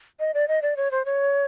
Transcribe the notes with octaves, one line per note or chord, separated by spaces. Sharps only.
D#5
D5
D#5
D5
C#5
C5
C#5